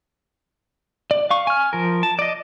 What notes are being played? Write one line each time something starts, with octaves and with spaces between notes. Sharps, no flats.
D5
F5 C#6
G#5 F6
F3 A#4
A5
D5 D#5